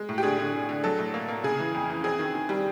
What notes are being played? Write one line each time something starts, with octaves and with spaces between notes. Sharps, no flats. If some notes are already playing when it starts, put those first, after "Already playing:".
Already playing: G#3
A2
G4
D3 G#4
D3
D3
D3
F#3 A4
A2
A#3
A#3
C#3 G#4
E3
F2
E3
C4 G#4
D#3
D#3
G3